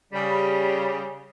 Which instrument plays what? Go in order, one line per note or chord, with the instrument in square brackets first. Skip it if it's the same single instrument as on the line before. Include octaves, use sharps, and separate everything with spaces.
[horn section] C#3 G3